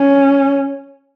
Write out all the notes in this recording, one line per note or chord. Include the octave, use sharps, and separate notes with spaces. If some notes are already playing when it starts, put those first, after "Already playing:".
Already playing: C#4